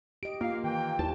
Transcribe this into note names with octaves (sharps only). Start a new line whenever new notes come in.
G4 D#5 D7
A#3 F4 F5
D#3 E3 G5
D#2 E4 A5